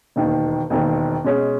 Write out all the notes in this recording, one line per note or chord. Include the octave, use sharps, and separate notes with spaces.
E1 D#2 D#3
E1 D#2 D#3
B2 G#3 C#4